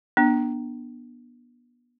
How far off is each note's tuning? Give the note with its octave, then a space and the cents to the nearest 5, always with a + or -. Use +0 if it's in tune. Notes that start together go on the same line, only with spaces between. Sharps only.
B3 -25 D4 +15